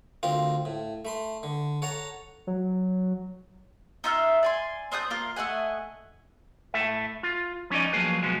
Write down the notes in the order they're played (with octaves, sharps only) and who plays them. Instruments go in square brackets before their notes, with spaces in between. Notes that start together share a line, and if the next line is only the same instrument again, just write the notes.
[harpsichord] D2 C4 F4 A#4 F5
A2
A3 B5 C6
D3
A4 C#5 F#5 A5 A#5
[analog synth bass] F#3
[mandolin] D#4 F4 E5 F6
D5 G#5 C6
C4 D4 D#6 G6
A#3 F4
A3 D#5 F#5 G#5
[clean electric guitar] A2 A4 E5
F4
F3 C#4 D#4 D5 D#5
F3 F#3 A#3 G#4 B4
B2 F3 F#3 G#3